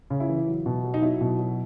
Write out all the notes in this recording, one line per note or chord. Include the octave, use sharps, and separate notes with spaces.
C#3
E4
E3
F#3
B2
F#3
D#4
F#3 E4
B2
F#3